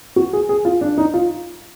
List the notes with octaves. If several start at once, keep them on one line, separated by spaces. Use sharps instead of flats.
F#4
G#4
G#4
F4
D4
D#4
F4